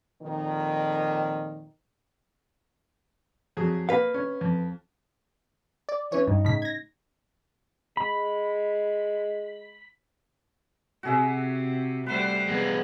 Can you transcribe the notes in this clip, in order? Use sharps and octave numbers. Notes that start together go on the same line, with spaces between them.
F2 A#2 D#3
F2 F#3 G#4
A#3 B4 F5
C#4
F2
D5
E3 C#4 C#5
G2 D#4
A2 C#3 B6
G#6 A#6
G#3 B5
C3 F#4 G#4 E5
G3 A3 B4 C5 F#5
G#3 B3